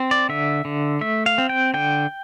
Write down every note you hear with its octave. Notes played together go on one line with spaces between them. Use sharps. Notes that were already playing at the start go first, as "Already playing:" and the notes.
Already playing: C4
D5
D3 E5
D3
A3 E5
F5
C4
G5
D3 G5